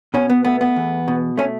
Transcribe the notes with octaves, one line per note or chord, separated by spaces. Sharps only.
B2 C#4
B3
A3 B3
B3
E2
B2
A3 C#4